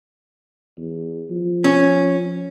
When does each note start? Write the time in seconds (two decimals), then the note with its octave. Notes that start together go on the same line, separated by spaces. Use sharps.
0.77 E2
1.30 F3
1.64 C#4